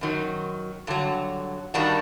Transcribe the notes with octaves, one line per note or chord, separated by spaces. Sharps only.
F#2 D#3 F#3
G2 D3 F#3
G2 D#3 G3 D4 F#4